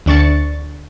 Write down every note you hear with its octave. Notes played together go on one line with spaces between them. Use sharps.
D2 D4 C#6 A6 C#7